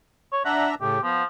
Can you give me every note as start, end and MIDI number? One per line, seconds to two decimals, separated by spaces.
0.32 0.43 73
0.45 0.75 62
0.45 0.75 76
0.45 0.69 78
0.45 0.75 82
0.81 0.99 45
0.81 0.99 49
0.81 0.99 57
0.81 1.02 67
1.03 1.24 53
1.03 1.23 59